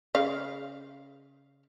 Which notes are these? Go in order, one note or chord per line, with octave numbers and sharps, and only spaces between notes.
C#3 F5